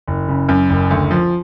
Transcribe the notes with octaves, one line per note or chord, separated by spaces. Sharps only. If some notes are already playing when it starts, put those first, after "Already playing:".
F#1
C#3
F#2
F#1
D2
F3